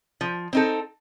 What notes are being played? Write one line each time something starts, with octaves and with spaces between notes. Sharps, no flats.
F3
C4 D#4 A4